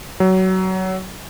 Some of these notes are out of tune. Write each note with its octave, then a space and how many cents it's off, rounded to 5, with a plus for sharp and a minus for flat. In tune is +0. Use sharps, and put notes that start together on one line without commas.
F#3 +20